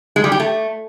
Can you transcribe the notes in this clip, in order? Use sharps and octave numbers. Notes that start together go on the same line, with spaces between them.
G#3
G3
G4
A3